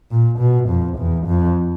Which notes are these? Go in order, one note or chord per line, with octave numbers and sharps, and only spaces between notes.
A#2
B2
F2
E2
F2